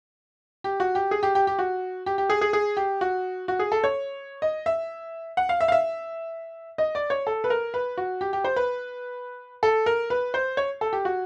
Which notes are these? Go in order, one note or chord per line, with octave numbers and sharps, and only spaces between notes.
G4
F#4
G4
G#4
G4
G4
G4
F#4
G4
G4
G#4
G#4
G#4
G4
F#4
F#4
G#4
A4
C#5
D#5
E5
F#5
F5
E5
F5
E5
D#5
D5
C#5
A4
B4
A#4
B4
F#4
G4
G4
C5
B4
A4
A#4
B4
C5
C#5
A4
G4
F#4